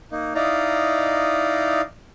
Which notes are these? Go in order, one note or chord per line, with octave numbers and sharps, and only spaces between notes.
A#3 D#4
D#4 E4 D5 D#5 F5 A#5